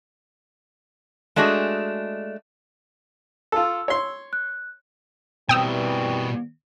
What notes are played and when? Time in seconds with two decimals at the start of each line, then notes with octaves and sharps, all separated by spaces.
1.36 G#3 A3 D4 F#4 G#4
3.52 F4 A4 E6
3.88 C#5 C6
4.33 F#6
5.49 B2 E3 G3 C4 A#4 G5 D#6 E6